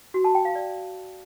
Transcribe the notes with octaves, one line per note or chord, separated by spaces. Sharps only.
F#4
A5
G5
F5
D5